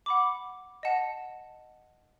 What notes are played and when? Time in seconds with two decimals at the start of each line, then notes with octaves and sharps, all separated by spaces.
0.06 F#5 B5 D6
0.83 D#5 F#5 A5